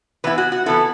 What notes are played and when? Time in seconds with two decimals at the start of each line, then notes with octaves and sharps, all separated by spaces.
0.24 E3 B3 E4 B4
0.38 F#4
0.52 F#4
0.66 E3 B3 E4 A4